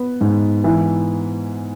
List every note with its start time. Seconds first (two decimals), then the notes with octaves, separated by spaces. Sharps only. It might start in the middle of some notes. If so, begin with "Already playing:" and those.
Already playing: B3
0.21 G#2
0.64 E3